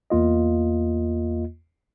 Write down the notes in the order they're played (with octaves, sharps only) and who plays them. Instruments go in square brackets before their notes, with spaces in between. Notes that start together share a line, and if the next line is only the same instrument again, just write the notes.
[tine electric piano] E2 A#3 F4 D#5